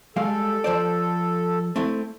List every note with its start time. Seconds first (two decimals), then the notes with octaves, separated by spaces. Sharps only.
0.16 G3 G#3 A4 F5
0.64 F3 C5 D5
1.76 A3 C4 E4